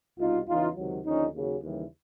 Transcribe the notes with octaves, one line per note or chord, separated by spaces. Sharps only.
C2 B2 G3 D#4 F4
E2 C#3 E3 D#4 F4
C#2 C3 D#3 F#3
D#2 D3 F3 C#4 D#4
D#2 C#3 F#3
D#2 C#3 E3 G3